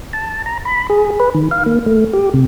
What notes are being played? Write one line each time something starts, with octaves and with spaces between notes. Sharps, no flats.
A5
A#5
B5
G#4
B4
D#3
F5
A#3
A3
G4
C3